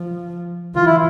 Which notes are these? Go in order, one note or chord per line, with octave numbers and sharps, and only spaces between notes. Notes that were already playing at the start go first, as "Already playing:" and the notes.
Already playing: F3
E3 F4
E4